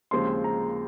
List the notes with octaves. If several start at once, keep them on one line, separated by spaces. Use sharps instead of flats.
D#2 C#3 F3 G#3 C4 C6
A#5